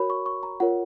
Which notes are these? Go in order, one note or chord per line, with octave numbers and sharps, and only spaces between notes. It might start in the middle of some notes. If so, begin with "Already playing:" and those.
Already playing: F#4 A#4 C#5 B5
C#6
C#6
A#5
F4 A#4 C#5 F#5